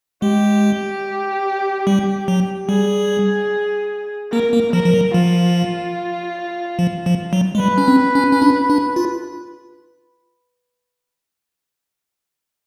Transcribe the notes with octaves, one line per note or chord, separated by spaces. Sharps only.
G#3 G4
G3
F#3
G3 G#4
A#3 A#4
A#3
F3 A#4
F3
F#3
F3 F4
F3
F3
F#3
G#3
G3 B4
C#4
C4
C#4
C#4
D4
D4
F4